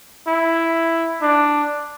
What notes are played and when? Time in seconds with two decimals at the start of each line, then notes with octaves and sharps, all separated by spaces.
0.28 E4
1.22 D4